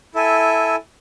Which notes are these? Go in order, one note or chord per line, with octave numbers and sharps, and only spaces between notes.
E4 A4 E5 G#5